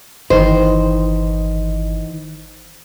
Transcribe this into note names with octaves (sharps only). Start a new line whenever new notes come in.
G1 D#3 E3 C5 D#5